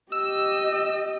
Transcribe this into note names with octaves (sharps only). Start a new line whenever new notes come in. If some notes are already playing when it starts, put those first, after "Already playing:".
G4 D#5 E6